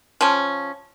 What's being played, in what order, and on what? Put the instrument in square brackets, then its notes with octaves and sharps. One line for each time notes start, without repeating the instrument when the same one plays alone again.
[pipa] F3 C#4